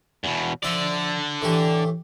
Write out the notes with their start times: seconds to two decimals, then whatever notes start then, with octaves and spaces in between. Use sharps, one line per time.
0.24 E2 B2
0.63 D3 F3 D5 E5
1.42 A2 E3 G4